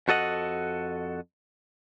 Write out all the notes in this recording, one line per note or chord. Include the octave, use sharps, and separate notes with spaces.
F2 F#4 A4 D#5 F#5